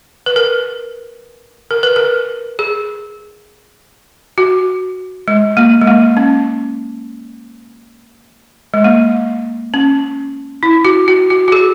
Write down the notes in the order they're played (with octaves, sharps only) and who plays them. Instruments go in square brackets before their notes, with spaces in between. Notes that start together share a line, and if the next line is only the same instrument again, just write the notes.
[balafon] B4
A#4
A#4
B4
A#4
G#4
F#4
G#3
A#3
G#3
A#3
C#4
G#3
A#3
C#4
E4
F#4
F#4
F#4
F#4
G#4